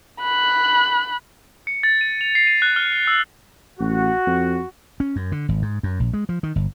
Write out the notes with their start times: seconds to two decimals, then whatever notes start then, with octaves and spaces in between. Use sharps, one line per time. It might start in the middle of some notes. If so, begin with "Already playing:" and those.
0.20 B5 F#6
1.67 C#7
1.83 A6
2.01 D#7
2.21 F7
2.35 C7
2.47 D#7
2.62 F#6
2.76 F6
3.07 E6
3.80 A1 F#4
4.27 F2
5.00 C#4
5.16 F#2
5.32 D3
5.49 G#1
5.62 G#2
5.83 F#2
6.00 A#1
6.13 G#3
6.29 F3
6.43 D#3
6.56 G1